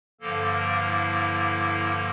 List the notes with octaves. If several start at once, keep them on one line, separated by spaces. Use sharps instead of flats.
G2 D3 F3 A#3 A4
A#4
E4